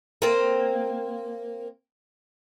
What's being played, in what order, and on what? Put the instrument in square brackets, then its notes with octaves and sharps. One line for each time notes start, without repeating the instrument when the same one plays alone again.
[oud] A#3 C4